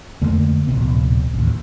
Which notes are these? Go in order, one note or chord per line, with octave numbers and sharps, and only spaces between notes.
F2 D3 A3 A#3
D1 A#1 C3 B3
A1 D#2